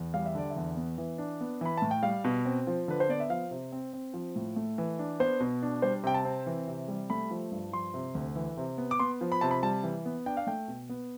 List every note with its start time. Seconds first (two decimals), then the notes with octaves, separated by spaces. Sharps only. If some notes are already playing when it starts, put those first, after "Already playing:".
Already playing: E2
0.14 G3 F5
0.26 E5
0.35 D3 D5
0.50 E5
0.56 E2
0.77 B3
0.98 E3
1.18 D4
1.41 B3
1.61 E3 B5
1.77 A2 A5
1.91 G5
2.03 G3 F5
2.24 B2
2.45 C4
2.67 F3
2.88 D3 B4
3.00 C5
3.09 B3 D5
3.20 E5
3.30 F3 F5
3.51 C3
3.72 C4
3.93 C4
4.14 F3
4.36 A2
4.56 A3
4.78 E3
4.99 D4
5.20 B3 C5
5.40 B2
5.62 D4
5.82 G3 C5
6.03 C3 G5
6.14 A5
6.25 C4
6.46 E3
6.68 C3
6.88 G3
7.10 A3 B5
7.31 F3
7.52 G2
7.72 F3 C6
7.94 C3
8.15 D2
8.35 E3
8.57 C3
8.78 B3
8.91 D6
8.99 B3 C6
9.21 F3
9.32 B5
9.41 C3 A5
9.51 B5
9.63 G3 A5
9.83 E3
10.05 B3
10.26 D4 G5
10.37 F5
10.47 A3 G5
10.68 B2
10.89 B3